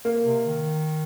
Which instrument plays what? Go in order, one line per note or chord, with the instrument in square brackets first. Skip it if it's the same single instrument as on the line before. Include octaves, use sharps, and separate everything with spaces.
[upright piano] A#3
[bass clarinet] C3
D#3